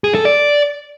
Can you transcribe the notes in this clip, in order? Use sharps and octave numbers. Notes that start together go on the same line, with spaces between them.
G#4
A4
D5